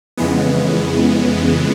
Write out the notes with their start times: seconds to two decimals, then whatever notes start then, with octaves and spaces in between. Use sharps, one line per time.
0.18 F2 C#3 E3 G#3 B3